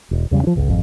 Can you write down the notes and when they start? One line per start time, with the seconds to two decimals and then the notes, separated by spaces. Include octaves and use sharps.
0.11 E1
0.31 E2 C#3 G3
0.43 F3 D4
0.55 G1 C#2
0.68 G#1 F2